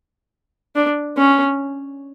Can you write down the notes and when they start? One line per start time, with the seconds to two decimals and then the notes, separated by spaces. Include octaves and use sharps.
0.76 D4
1.17 C#4